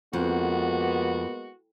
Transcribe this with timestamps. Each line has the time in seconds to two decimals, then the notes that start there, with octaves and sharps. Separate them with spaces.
0.13 F2 G#3 A#3 B3 F#4